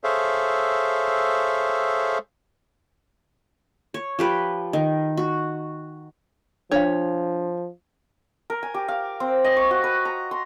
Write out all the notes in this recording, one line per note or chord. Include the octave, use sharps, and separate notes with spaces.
G#4 A4 C5 C#5 E5 F5
C#5
F3 G4 B4
D#3
F#4
F3 D4 C#5 F5
A#4
G#5
G4
F5
C4
D#5
C#6
F#4
B4
A#5
C6